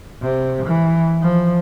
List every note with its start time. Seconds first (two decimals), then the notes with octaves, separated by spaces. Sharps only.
0.22 C3
0.66 E3
1.22 F3